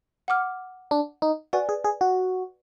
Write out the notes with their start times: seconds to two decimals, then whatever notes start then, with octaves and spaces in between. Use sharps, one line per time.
0.28 F#5 D6 F6
0.91 D4
1.22 D#4
1.53 F#4 B4 D5 G#5
1.69 G#4
1.84 G#4
2.01 F#4